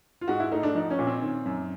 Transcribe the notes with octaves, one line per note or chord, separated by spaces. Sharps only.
F4
G#2 F#4
E4
A3 D#4
D4
F3 D#4
C#4
A#2
C4
D#3
F#2